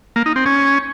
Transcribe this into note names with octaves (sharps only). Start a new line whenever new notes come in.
A#3
D#4
C4
C#4